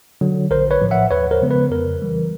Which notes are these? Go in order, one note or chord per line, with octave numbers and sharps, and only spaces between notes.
D3 F#3
A#1 A#4 C5
B4 C#5
A2 F3
E5 F#5
D#2 B4 C#5
A#4 C5
C#3 F3 G#3 B3
B4
F2 A#4
C#3 E3 G3